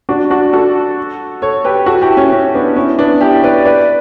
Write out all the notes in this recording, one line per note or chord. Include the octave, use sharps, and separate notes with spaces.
D4 F#4
D4 F#4
F#4 A4
A4 C#5
G4 B4
F#4 A4
E4 G4
C#4
C#4
B3 D4
C#4 E4
B3 D4
E4 G4
B4 D5
B4 D5